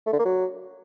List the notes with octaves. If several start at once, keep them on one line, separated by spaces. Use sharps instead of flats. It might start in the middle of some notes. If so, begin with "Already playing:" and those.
A3
D3
A#3
F#3